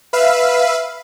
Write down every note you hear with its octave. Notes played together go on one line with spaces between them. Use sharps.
B4 E5 F5